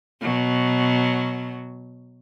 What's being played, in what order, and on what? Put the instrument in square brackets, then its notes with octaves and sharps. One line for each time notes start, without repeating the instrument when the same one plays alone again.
[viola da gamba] B2 F#3